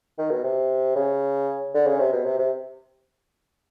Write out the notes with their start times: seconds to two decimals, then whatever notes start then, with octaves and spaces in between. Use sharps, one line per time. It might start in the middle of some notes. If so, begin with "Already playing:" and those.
0.18 D#3
0.31 B2
0.44 C3
0.96 C#3
1.74 D3
1.87 C#3
2.00 C3
2.13 B2
2.25 C3
2.39 C3